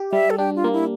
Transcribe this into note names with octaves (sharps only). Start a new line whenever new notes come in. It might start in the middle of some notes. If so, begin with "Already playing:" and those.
Already playing: G4
G3 E5
A4
D4 G4
F4
A#3
E4